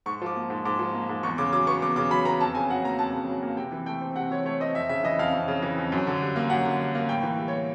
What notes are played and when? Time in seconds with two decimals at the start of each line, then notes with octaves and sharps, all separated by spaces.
0.06 G#2 C#6
0.22 F3 D6
0.36 A#3
0.50 G#2
0.65 G#2 D6
0.79 F3
0.94 A#3
1.09 G#2
1.23 E2 C#6
1.38 C#3 D6
1.53 F#3 D6
1.67 B3 C#6
1.82 E2 D6
1.96 C#3 D6
2.11 F#3 B5
2.25 B3 A#5
2.40 F2 A5
2.55 C#3 G#5
2.70 F#3 F#5
2.84 A#3 A#5
2.99 F2 A5
3.13 C#3
3.29 F#3
3.43 A#3
3.57 C3 G5
3.72 E3
3.86 A3 G5
4.01 C4
4.16 C3 F#5
4.31 E3 C#5
4.45 A3 C#5
4.60 C4 D#5
4.75 F2 E5
4.89 C#3 E5
5.04 E3 D#5
5.19 F2 F5
5.33 F2
5.48 C#3
5.62 E3
5.78 F2
5.92 F#2
6.07 D3
6.22 G3
6.36 A#3
6.50 F#2 F#5
6.66 D3
6.80 G3
6.95 A#3
7.09 A2 G5
7.23 E3
7.39 G3
7.48 C#5
7.54 B3